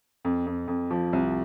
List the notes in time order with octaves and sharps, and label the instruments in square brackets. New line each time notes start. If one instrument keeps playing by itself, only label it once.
[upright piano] F2
F2
F2
F3
C2